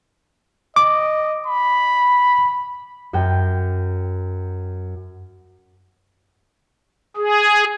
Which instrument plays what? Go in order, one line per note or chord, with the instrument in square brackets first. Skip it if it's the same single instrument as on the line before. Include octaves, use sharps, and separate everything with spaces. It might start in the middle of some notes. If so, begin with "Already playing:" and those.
[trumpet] D#5 [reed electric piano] D6
[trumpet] B5
[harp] F#2 F#4 G5
[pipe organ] G#4